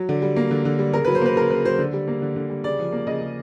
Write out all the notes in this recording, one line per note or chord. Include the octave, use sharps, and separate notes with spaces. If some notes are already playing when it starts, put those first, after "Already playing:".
Already playing: F#3
D3
G3
A#3
D3
D3
G3
C#3 A#4
F#3 B4
C5
A#3 B4
C#3 A#4
C#3 B4
F#3 C5
D3
G3
A#3
D3
D3
G3
C#3 D5
F3
A#3
C#3 D#5
C#3